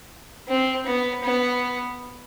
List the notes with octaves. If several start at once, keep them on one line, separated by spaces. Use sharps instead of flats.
C4
B3
B3